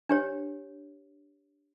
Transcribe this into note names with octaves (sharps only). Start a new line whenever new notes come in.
D4 G4 C#5